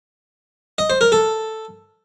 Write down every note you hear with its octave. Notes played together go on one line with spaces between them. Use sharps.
D#5
C5
A#4
A4